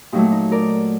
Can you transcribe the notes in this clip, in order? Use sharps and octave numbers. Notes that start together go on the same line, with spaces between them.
A#2 F#3 A3 D#4 G4
D#4
A#4 D5